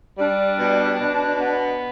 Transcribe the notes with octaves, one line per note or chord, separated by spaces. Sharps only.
G3 D4
B2
B2
B3